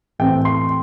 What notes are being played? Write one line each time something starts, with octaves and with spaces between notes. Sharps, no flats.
A2 E3 A3 C4 G5
C6